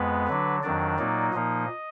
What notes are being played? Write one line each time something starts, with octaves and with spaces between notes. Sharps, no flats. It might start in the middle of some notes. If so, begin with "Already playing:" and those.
Already playing: F2 G#3 B3 B4
D3 F#3 D4
F2 D#3 F#3 D4 D5
A#2 F#3 A#3 D#4
A#2 F3 A#3 D#4 D#5